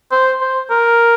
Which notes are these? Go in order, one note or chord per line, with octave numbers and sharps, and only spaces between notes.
C5
C5
A#4